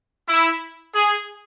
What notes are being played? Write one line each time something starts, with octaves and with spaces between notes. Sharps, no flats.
E4
G#4